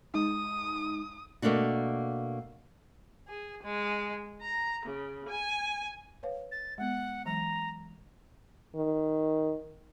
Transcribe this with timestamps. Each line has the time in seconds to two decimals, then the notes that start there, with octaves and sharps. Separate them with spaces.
0.14 G#3 D#4 D#6
1.42 B2 A3 A#3 D4 F#4
3.28 G#4
3.63 G#3
4.42 A#5
4.86 C#3
5.29 G#5
6.23 B4 C#5 F5
6.51 A6
6.78 G#3 B3 F#5
7.25 E3 F#3 G#3 A#5
8.75 D#3